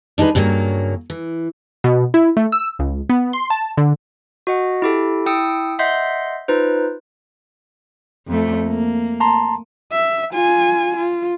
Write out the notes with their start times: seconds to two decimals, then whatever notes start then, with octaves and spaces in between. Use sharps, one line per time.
0.18 D4 D#4 G4 G#4 B4
0.35 G2 C#3 F#3 A3 A#3
1.10 E3
1.84 B2
2.14 E4
2.37 A3
2.52 E6
2.79 C#2
3.09 B3
3.33 C6
3.50 A5
3.77 D3
4.47 F#4 D#5 F#5
4.82 E4 G4 A4
5.26 E4 G5 D#6 E6 C#7
5.79 D#5 E5 F#5 C6 G6 C7
6.48 D#4 F4 B4 C5
8.28 F2 A3
8.67 A#3
9.20 A5 A#5 C6
9.92 E5
10.33 F4 G#5
10.97 F4